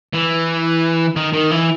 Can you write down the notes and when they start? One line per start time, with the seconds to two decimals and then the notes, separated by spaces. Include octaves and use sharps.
0.14 E3
1.16 D#3
1.33 D#3
1.51 E3